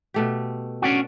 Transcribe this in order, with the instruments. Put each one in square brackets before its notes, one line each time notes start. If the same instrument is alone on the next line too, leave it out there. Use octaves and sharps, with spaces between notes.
[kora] B2 A3 G4
[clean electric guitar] C#4 D4 F#4